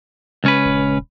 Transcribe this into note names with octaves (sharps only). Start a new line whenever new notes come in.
C#2 C#4 B4
D#1